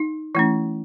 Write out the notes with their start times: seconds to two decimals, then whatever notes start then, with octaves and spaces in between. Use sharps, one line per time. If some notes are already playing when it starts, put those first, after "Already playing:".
Already playing: D#4
0.35 E3 A3 C#4 E4